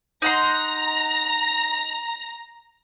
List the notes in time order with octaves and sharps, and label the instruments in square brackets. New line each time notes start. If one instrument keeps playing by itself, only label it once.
[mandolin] D#4 F#5 C6 [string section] A#5